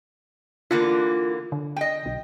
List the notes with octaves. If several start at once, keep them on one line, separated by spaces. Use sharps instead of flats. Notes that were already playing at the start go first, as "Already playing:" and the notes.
D3 E3 A#3 F4
D3
D#5 G5
B1